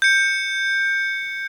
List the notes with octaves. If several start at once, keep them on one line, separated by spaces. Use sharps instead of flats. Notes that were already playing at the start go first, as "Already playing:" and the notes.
G6 C#7